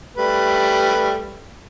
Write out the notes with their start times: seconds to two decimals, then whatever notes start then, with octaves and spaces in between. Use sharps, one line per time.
0.17 G3 A3 B4